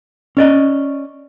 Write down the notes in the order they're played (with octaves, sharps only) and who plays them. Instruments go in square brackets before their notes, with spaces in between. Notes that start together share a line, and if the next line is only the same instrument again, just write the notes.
[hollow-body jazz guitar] C#4 D5 D#5